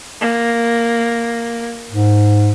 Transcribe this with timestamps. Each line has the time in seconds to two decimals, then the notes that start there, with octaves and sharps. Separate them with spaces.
0.21 A#3
1.91 G#2